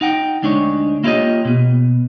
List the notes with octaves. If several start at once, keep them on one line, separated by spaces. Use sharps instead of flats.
D#4 F#5 G5
D2 G#3 D4 D#4 C#5
A#3 E4 F4 G4 C#5 D#5
B2 B3